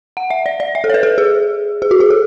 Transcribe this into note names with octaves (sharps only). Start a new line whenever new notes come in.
F#5
E5
D5
D5
E5
A4
C#5
B4
A4
G#4
G#4
F#4
G#4
A4